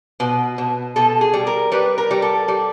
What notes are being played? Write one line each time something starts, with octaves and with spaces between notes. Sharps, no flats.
B2 B4
B2
B2 A4
G#4
G3
A#4
G3 B4
A#4
G3
A4
G3